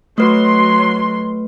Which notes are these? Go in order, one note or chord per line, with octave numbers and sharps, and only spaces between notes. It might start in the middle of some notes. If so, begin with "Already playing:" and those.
F#3 A3 B4 C6